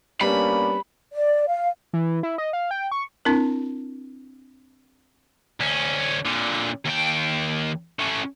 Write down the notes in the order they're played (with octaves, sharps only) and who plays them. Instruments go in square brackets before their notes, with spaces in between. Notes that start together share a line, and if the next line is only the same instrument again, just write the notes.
[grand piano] G3 B3 [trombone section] A#3 C#4 D4 [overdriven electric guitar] B5
[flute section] D5
F5
[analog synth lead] E3
E4
D#5
F5
G5
C#6
[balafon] C4 D4 E4 A#4
[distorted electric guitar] D2 C#4
A#2 D3
D#2 G5
A3 C#4